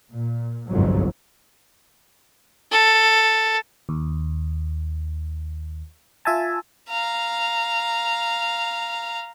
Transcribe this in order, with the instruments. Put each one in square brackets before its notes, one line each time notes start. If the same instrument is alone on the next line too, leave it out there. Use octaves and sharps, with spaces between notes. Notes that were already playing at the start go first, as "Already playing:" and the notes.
[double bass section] A#2
G1 C2 F2 G#2 F#3
[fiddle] A4
[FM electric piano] D#2
F4 E5 G#5 A5
[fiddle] F5 A#5